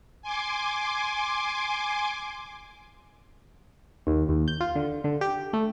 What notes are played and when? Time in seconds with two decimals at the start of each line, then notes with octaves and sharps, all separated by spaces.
0.22 G#5 C6 D6
4.07 D#2
4.29 D#2
4.48 G6
4.60 F4
4.76 D3
5.04 D3
5.21 G4
5.53 A3